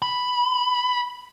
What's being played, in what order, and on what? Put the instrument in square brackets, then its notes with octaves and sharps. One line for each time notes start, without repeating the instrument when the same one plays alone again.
[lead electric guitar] B5